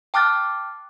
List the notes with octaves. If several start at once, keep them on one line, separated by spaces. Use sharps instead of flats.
G5 A5 D6 F6 F#6 A6